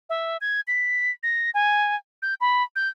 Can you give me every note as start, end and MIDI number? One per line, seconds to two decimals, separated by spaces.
0.10 0.37 76
0.41 0.61 92
0.68 1.11 95
1.23 1.50 94
1.54 1.96 80
2.22 2.34 91
2.41 2.63 83
2.76 2.89 91